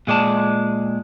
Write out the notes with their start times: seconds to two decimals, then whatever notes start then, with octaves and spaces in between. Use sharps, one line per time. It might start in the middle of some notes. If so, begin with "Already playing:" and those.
0.07 A#2 G#3 D5 A5